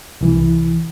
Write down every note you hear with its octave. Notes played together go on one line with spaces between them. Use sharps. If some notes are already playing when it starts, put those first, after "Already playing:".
C2 E3